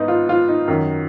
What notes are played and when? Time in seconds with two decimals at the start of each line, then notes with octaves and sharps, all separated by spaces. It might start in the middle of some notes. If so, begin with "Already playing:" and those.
Already playing: G#2 B3 D#4
0.08 F4
0.29 F4
0.49 D#4
0.68 F#2 D#3